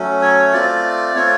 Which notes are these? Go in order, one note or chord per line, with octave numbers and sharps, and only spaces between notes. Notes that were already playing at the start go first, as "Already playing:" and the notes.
Already playing: F#3 A3 C#4
C#5
A3 C4 F4 D5
A3 C4 F4 C#5